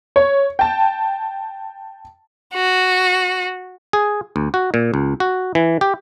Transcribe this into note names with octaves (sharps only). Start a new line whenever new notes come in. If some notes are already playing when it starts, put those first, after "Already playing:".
C#5
G5 A5
F#4
G#4
D2
F#4
A#2
C#2
F#4
E3
G4